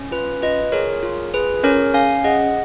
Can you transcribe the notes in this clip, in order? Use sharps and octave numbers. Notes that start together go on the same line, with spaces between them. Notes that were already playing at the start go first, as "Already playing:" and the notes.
Already playing: C#4
F4 B4
F4 B4 D#5
G#4 A#4 C#5
F4
G#4 B4
C#4 A#4 C#5
C#4 F5 G#5
G#4 D#5 F#5